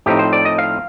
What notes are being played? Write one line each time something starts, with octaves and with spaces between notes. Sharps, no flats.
A2 F3 C4 D#4 G4
C5
D5
D#5
F5